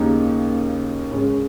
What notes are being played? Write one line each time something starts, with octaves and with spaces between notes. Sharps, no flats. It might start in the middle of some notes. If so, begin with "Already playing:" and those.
Already playing: D#2 C#3 A#3 D#4
C#3 G#3 C#4